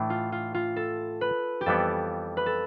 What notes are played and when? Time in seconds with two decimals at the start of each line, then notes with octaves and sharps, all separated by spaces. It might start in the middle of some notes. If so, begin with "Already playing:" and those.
Already playing: A2 E3 A3 D4
0.10 F4
0.32 F4
0.54 F4
0.76 A4
1.21 B4
1.61 G4
1.66 F2 E3 G3 B3 A4
2.37 B4
2.46 A4